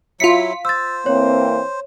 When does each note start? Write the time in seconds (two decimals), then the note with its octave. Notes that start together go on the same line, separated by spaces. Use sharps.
0.20 F#3 E4 F4 B6 C#7
0.65 C5 E6 A6
1.06 E3 A#3 C4 C#5